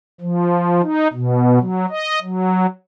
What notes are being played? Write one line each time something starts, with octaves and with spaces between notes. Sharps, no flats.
F3
D#4
B2
F#3
D#5
F#3